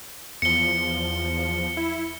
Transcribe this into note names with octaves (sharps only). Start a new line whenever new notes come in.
E2 F3 C#7 G7
E4